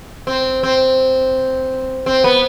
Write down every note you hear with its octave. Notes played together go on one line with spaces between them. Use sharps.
C4
C4
C4
B3